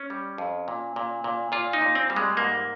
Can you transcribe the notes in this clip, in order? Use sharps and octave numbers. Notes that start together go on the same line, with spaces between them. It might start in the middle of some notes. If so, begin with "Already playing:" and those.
Already playing: C#4
G3
F2
A#2
A#2
A#2
A#2 F4
D#4
A#2
C4
G3
G#3
G#2 A#3